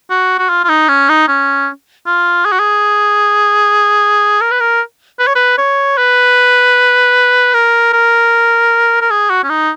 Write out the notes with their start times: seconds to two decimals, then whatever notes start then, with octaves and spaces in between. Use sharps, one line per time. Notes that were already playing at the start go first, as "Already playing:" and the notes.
0.10 F#4
0.39 F#4
0.49 F4
0.64 F4
0.69 D#4
0.88 C#4
1.09 D#4
1.28 C#4
2.06 F4
2.45 G#4
2.52 F#4
2.59 G#4
4.41 A#4
4.51 B4
4.60 A#4
5.19 B4
5.27 C#5
5.35 B4
5.58 C#5
5.98 B4
7.54 A#4
7.93 A#4
9.01 A#4
9.11 G#4
9.30 F#4
9.43 C#4
9.50 D#4